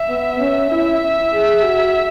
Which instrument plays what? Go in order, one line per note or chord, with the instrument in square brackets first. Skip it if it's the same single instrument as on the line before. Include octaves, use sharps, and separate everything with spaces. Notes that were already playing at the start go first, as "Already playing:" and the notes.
Already playing: [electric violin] E5
[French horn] B3
C#4
[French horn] E4 [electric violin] E5
[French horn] G#4
F#4